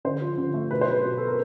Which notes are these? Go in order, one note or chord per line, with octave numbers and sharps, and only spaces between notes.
D3 C5
F3
D3
A3
B2 B4
C5
F#3 B4
B2
B3 A4
A#4